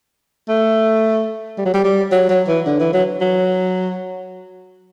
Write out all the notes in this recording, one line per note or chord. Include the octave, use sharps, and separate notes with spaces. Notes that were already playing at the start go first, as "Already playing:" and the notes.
A3
G3
F#3
G3
G3
F#3
F#3
E3
D3
E3
F#3
F#3